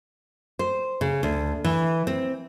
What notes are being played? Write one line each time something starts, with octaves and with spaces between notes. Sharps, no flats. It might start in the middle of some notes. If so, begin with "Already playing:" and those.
C5
C#3
D2
E3
C4